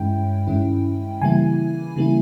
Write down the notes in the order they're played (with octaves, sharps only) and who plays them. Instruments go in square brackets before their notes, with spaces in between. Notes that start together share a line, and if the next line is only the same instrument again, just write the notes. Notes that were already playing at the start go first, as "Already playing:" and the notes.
Already playing: [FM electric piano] G2 D#3 G#3 C#4 E4 G5
G2 D#3 G#3 C#4 E4
C#3 E3 G3 A#3 E4 G#5
C#3 E3 G3 A#3 E4